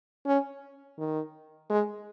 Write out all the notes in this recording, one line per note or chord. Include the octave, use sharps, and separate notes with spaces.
C#4
D#3
G#3